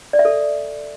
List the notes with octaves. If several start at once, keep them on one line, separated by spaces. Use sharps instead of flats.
D5
E5
A4